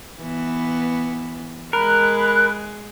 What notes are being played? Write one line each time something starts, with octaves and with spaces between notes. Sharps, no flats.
E3 B3
G#3 A#4 B5 F#6